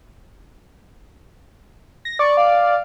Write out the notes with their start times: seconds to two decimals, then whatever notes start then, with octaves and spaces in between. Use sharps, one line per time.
2.05 A#6
2.19 D5 C#6
2.37 F5